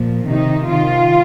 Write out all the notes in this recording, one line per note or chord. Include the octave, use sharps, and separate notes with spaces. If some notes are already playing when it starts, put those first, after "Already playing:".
Already playing: A#2 F3
C3 D#3 D#4
C3 D#3 F4